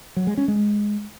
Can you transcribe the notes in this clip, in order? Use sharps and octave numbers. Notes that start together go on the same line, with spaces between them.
F#3
G#3
C#4
G#3